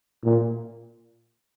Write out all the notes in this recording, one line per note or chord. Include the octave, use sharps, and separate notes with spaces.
A#2